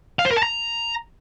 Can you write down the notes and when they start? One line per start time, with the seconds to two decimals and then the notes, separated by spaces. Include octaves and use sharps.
0.19 F5
0.25 C5
0.31 A#4
0.37 A5
0.43 A#5